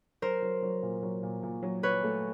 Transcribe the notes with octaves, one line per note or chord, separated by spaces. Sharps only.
F#3 A#4 C5
F#3
F#3
A#2
F#3
A#2
A#2
F#3
F#3 B4 C#5
A3